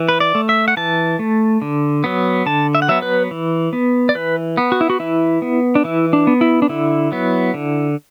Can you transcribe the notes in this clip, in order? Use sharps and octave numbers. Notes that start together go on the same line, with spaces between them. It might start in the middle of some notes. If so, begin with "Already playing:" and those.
Already playing: E3
B4
D5
A3
E5
F#5
E3 A5
A3
D3
F#3 B3
D3 A5
E5
F#5
F#3 B3 E5
B4
E3
B3
D5
E3 B4
B3
F#4
E4
F#4
E3 E4
B3
D4
E3 E4
D4
B3
E4
D4
D3 E4
F#3 B3
D3